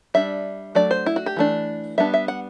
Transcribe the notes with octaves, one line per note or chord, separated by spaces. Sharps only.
G3 D4 E5
F#3 A3 D4 D5
C5
E4
F#4
G4
E3 A3 D4
G3 B3 D4 E5
E5
F#5